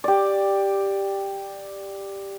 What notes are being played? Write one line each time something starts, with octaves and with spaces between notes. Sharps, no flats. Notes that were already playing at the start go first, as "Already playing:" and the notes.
G4 D5